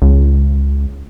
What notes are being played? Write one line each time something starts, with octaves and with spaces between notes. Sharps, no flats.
C#2